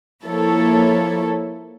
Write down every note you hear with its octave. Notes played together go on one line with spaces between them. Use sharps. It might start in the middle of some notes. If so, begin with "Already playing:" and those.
F3 A#3 E4 A4 C#5